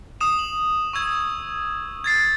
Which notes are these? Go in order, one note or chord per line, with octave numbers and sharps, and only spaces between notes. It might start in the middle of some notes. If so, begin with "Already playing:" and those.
D#6 E7
F#7
C#6 E6 G#6
G#6 A6 C7